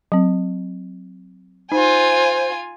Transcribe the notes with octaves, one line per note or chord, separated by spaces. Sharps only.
F#3 C4
D#4 F4 C5 G#5